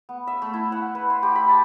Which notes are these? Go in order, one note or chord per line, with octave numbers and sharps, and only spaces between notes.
B3
E5
A3
E4
F#5
B4
C6
G4
B5
A5